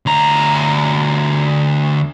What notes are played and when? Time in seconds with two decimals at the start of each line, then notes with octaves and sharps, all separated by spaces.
0.06 D2 A#5